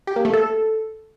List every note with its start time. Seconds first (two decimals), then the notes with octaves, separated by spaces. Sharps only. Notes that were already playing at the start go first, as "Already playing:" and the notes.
0.07 G4
0.16 A#3
0.25 A3
0.34 A4